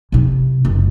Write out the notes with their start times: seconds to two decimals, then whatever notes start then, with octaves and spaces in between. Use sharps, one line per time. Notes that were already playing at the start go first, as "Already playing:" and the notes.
0.12 C3 E4
0.65 F#1 C#2